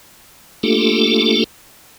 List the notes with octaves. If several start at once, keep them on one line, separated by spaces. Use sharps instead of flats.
A3 A#3 D4 F4 G4 A4